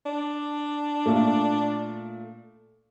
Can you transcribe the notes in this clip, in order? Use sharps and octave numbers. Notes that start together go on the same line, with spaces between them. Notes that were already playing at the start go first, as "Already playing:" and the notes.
D4
A#2 A3